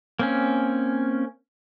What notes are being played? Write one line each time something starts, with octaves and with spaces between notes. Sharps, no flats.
A#3 C4 C#4